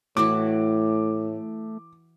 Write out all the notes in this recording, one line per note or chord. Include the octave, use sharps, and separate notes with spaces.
A2 E3 A3 E4 F#4 D6